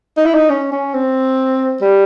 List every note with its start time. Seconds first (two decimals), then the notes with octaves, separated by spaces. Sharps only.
0.17 D#4
0.26 E4
0.34 D#4
0.50 C#4
0.72 C#4
0.94 C4
1.81 G3